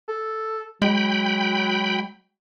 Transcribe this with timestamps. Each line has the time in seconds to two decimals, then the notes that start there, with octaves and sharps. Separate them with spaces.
0.08 A4
0.82 F#3 G#3 G5 B5